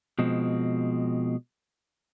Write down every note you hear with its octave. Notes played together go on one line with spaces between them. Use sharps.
B2 F3 G#3 C4